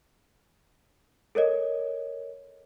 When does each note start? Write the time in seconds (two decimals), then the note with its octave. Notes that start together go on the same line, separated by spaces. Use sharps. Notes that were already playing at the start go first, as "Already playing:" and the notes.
1.35 A4 A#4 C#5 D#5